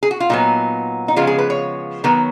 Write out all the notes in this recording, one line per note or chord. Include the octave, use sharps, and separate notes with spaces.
G#4
F#4
F4
A#2 F#3 B3 D#4
D#4
C#3 F3 G#3 B3 F4
G#4
B4
C#5
D#3 F#3 B3